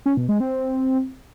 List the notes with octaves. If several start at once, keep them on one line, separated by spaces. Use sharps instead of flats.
C#4
B2
G#3
C4